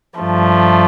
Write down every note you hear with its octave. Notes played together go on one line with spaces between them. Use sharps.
G2 F3 A3